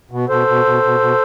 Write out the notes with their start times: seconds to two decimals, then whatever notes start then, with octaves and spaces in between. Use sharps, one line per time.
0.11 B2
0.29 B2 A4 C5
0.47 B2
0.65 B2
0.83 B2
1.00 B2